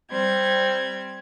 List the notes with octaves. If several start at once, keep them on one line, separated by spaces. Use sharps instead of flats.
G3 C4 G#6